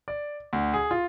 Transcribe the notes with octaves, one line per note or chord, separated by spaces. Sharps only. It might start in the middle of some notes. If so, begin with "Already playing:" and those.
D5
D2
G#4
F4